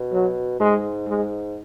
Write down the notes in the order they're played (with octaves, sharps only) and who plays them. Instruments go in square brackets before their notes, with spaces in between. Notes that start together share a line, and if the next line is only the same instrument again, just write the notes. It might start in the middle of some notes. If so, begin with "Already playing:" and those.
Already playing: [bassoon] B2
[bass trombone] F#3
[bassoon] G#2 [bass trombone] G#3
[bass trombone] G#3